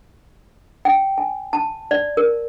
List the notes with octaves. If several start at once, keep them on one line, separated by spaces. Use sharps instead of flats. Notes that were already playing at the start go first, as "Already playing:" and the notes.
G5
G#5
A5
D5
A#4